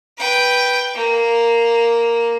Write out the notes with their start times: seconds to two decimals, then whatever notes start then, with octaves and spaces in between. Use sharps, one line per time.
0.18 B4 G5
0.94 A#3